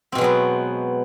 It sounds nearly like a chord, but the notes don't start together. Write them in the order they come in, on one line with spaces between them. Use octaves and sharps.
C4 B2 G#3 F#3 B3